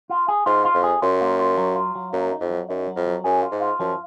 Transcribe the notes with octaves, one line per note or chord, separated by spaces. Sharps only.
F4
G#4
G#2 F4
F4
F2
G#4
F#2 F4
A#3
F4
F#3
F4
F#3
F#2 A#3
D#4
F2
F#3
F#2 D#4
F#3
F2
F#3
F#2 G#4
F4
G#2
F4
F#2 F3